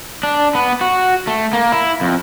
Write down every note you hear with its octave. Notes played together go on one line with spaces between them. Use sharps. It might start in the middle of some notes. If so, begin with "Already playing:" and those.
D4
B3
F#4
A3
A#3
E4
F2